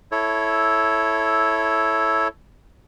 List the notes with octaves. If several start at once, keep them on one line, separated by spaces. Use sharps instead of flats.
E4 A4 C#5